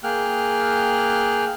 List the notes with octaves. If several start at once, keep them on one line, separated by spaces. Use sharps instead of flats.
A#3 G#4 G5 F6 F#6